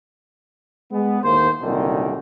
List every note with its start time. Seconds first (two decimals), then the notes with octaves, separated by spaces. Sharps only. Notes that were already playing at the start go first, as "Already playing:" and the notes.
0.91 G#3 B3
1.23 D#2 A2 A#3 C5
1.62 C2 F#2 A#2 D3 D#3